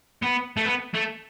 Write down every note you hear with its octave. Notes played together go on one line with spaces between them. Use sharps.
B3
A3
B3
A3